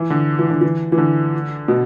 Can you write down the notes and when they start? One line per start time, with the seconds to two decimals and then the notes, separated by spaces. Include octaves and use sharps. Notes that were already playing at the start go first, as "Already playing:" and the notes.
Already playing: E3
0.10 D3
0.39 E3
0.50 D3
0.61 E3
0.92 E3
0.98 D3
1.68 B2